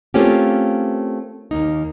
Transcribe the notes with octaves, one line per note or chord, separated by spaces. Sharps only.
A3 A#3 C4 C#4 F4 G4
D#2 A#3 D#4